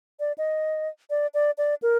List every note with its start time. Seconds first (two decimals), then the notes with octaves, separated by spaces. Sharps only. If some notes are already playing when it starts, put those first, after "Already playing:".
0.20 D5
0.38 D#5
1.10 D5
1.34 D5
1.58 D5
1.82 A#4